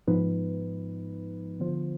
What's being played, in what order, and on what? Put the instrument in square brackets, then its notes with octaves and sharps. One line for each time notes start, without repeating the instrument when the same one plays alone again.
[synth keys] G#2 F3 B3 D#4 B4
D3 F3 B3 F4 C5